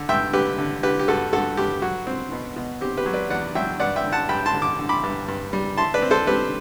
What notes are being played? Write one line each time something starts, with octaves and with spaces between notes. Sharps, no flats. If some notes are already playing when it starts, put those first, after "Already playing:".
Already playing: D3
G2 E5 G5
D3 G4 B4
D3
D3 G4 B4
G4
G2 F#4 A4
G2 F#4 A4
G2 G4
F#3 F#4
C4
B2
B2
C4 G4
G4 B4
F#3
B4 D5
E2 D5 F#5
F#3 E5 G5
G2 D5 F#5
E5 G5
D3
F#5 A5
G2 G5 B5
A5 C6
D3
D6
D3
B5 D6
G2
G2
G3
E4 A5 C6
B4 D5
C4
A4 C5
C4 G4 B4